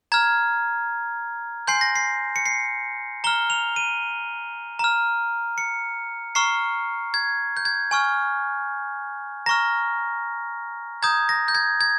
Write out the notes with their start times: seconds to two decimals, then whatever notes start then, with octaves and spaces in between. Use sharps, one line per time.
0.12 A#5 F6 G#6
1.67 G#5 C6 G6 C7
1.81 A#6
1.96 C7
2.36 C#7
2.46 C7
3.24 A#5 F6 G7
3.50 F7
3.76 D#7
4.79 A#5 F6
5.58 C#7
6.35 A#5 C#6 F6 C7
7.14 G#6
7.57 G6
7.65 G#6
7.91 G#5 C#6 F6
9.46 A#5 C#6 F6 A#6
11.03 A#5 D#6 G6 G#6
11.29 A#6
11.48 G6
11.55 G#6
11.81 G#6